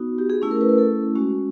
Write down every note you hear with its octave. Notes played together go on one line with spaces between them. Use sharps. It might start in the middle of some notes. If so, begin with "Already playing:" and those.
Already playing: B3 D#4 F#4
G4
G#4
A3 C#4 E4 G#4
A#4
B4
A#4
A4
G#3 C#4 F#4